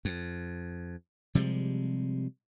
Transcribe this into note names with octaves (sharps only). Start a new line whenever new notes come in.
F2
C3 F3 G3 G#3